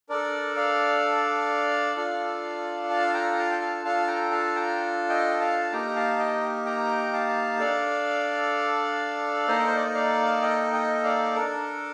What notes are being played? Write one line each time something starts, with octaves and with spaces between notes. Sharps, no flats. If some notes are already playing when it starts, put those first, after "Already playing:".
D4 A4 A#4 D5
D5 F5
D4 F4 A4
F5 A5
G5 A#5
F5 A5
G5
F5 A5
D4 F4 A4 F5 A5
G5 A#5
F5 A5
G5 A#5
D#5 G5
F5 A5
A#3 D#4 G4 G5 A#5
F5 A5
D#5 G5
G5 A#5
F5 A5
D4 A4 D5 F5
A#3 D#4 A4 C5 D#5
A#4
C5
D5
D#5
D5 F5
D#5 G5
D#5 G5
D5 F5
D4 A4 A#4